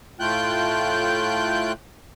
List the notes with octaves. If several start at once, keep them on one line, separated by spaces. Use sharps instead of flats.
A2 A3 F4 G5 F#6 G6